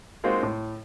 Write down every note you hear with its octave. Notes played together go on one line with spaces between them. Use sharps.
G#3 A#3 C4 D#4 F4 F#4
A2